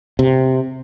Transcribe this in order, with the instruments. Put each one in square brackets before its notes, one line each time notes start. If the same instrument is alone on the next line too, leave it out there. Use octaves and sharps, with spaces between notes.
[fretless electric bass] C3